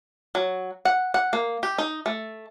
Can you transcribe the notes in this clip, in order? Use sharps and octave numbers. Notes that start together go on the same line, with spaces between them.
F#3
F#5
F#5
A#3
G4
D#4
A3